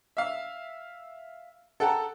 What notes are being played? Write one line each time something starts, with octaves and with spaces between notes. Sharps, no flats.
E5 F5
A4 F#5 G5 A5 A#5